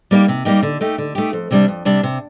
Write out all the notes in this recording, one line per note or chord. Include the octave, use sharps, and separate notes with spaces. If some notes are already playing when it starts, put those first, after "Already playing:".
G3 A#3 D#4 G4
C3
G3 A#3 D#4 G4
D3
A3 D#4 G4
D3
A3 D#4 G4
F2
C3 G3 D4
F2
C3 G3 D4
C3